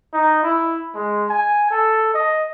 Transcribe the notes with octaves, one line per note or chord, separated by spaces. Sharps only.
D#4
E4
G#3
G#5
A4
D#5